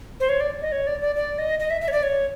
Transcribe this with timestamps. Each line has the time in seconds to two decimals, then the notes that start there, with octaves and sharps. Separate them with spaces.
0.20 C5
0.29 C#5
0.40 D5
0.61 D#5
0.72 C#5
0.87 D5
1.01 D5
1.16 D5
1.38 D#5
1.60 D#5
1.70 E5
1.81 E5
1.88 C#5
1.92 D5
2.03 C#5